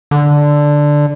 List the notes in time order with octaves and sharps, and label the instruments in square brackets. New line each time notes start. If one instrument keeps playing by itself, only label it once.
[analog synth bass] D3